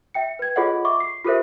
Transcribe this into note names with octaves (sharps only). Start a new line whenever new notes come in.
E5 G5 C#7
B4 G#6
F4 G#4 A4 C#5 D#5 F#5
E5 C#6 D6
C7
F4 G4 A4 A#4 C5 E5